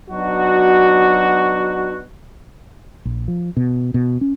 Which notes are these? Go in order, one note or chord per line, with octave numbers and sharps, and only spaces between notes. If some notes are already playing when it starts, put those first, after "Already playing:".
F#3 B3 D4 D#4 F#4
A#1
F3
B2
B2
C#4